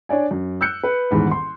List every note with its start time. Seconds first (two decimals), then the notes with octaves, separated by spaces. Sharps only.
0.09 D4 C#5 D5 G#5
0.31 F#2
0.61 E6 F#6 G6 C#7
0.84 B4
1.11 D#1 A1 E2 G#2 B5
1.31 C6